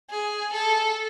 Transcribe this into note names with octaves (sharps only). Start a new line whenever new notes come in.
G#4
A4